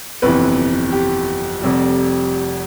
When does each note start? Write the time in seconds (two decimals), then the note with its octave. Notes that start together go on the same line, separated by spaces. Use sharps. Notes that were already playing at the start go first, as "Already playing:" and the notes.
0.22 G1 F2 C3 E3 B4
0.92 G4
1.62 F1 F2 C3 G3